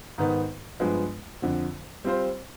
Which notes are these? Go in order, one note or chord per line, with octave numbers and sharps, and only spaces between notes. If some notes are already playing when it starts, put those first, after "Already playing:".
G#2 D#3 B3
G2 F3 G#3 B3
F2 D3 F3
G3 C4 F4 C5